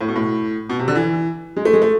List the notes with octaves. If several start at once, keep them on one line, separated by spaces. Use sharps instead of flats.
A2
B2
A2
B2
C3
D3
E3
G#3
A3
G#3
A3